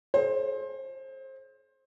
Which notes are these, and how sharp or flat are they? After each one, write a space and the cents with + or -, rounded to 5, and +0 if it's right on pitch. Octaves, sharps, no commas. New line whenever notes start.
G#4 +45 C5 +25